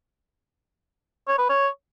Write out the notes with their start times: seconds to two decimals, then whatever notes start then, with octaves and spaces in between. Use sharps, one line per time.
1.28 C#5
1.39 B4
1.49 C#5